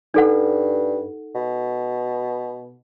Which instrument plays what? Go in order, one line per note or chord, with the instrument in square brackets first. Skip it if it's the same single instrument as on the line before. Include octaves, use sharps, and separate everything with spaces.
[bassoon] G2 [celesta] D#4 A4 F#5
[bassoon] B2